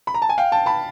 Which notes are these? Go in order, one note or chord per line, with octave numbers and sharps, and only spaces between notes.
B5
A#5
A5
G#5
F5 G5
G5 A5
A5 B5